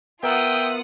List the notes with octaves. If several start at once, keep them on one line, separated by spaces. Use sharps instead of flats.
B3 F4 A#4 E5 F#5 G5 D#6 E6